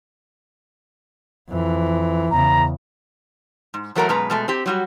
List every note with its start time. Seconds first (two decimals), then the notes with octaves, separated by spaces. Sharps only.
1.50 F2 E3
2.31 E2 C#3 A#5
3.74 G#2
3.95 E2 F#3 A3 A#4 F#5 A#5
4.09 F#2 B2 G#3 B4 A#5
4.30 B2 G#3 A3
4.48 C4 G4
4.66 F#3 G3 F#4